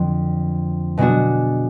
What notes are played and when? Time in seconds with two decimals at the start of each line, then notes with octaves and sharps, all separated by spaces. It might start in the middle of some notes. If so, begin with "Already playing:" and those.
Already playing: F2 D3 F3
0.97 B2 G#3 B3 D4 F#4